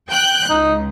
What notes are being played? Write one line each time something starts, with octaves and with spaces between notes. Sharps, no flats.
G5 F#6 G6
C#2 D#4